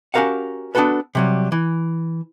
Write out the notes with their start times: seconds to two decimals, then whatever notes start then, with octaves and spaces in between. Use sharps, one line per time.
0.14 C#4 F#4 G4 A#4 F5 F#5
0.75 B3 D4 F4 F#4 A4 B4
1.15 C3 F#3 G3
1.52 E3